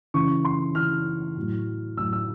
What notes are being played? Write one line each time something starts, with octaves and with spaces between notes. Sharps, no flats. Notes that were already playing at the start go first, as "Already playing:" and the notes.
C#3 E3 C#6
C6
C#3 E3 F6
A2 F#3
A2 F#3 E6
E6